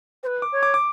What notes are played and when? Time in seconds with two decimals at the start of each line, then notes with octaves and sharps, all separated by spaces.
0.23 C5
0.26 B4
0.42 D6
0.52 C#5
0.63 D6
0.74 D6